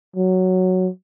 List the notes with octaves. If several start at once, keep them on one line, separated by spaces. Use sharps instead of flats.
F#3